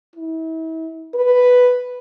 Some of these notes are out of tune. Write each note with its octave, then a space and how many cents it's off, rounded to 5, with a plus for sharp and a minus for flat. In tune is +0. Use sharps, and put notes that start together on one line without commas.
E4 -40
B4 +5